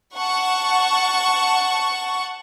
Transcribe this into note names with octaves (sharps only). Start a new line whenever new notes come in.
F#5 A5 C#6